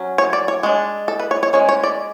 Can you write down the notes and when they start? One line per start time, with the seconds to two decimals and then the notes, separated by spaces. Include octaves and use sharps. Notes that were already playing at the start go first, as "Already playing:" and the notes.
Already playing: F#3 C#4
0.18 C#5
0.33 D5
0.48 C#5
0.63 G#3 D4 C#5
1.08 A4
1.19 B4
1.31 C#5
1.43 C#5
1.53 G#3 C#4 C#5
1.69 C#5
1.83 D5